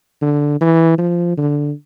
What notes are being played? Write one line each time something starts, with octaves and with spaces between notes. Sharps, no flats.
D3
E3
F3
D3